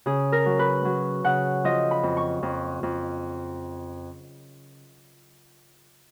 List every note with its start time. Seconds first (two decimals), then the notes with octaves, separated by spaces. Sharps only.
0.06 C#3 G#4
0.32 A#4
0.46 F#3
0.59 B4
0.85 F#3
1.24 C#3 F#5
1.64 F3 D#5
1.91 B5
2.03 F2
2.17 C#6
2.43 F2
2.83 F2